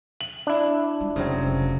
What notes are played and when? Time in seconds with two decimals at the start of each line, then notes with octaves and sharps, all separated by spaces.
0.21 F#7
0.47 D4 E4
1.00 G#3 F4
1.16 F1 C#3 F#3 C4